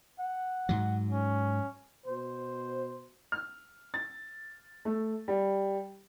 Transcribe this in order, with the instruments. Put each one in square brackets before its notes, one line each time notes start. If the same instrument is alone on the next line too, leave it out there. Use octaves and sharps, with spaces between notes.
[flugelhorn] F#5
[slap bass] G#2 F#3
[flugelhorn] C#4
[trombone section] B2 C5
[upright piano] F6
A6
A3
G3